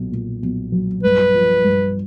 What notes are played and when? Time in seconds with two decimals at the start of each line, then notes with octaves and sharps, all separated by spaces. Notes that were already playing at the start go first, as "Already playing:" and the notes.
Already playing: B1 A#2
0.12 A#2
0.42 B1
0.72 F#3
1.03 G2 B4
1.33 F3
1.64 G2